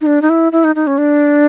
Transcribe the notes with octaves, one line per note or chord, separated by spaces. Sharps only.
D#4
D4
D#4
E4
E4
D#4
D#4
C#4
D4